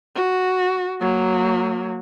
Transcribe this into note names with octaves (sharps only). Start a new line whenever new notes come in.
F#4
F#3 A#3